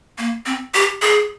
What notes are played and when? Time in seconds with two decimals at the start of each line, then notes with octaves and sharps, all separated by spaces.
0.18 A#3
0.46 C4
0.74 G4
1.02 G#4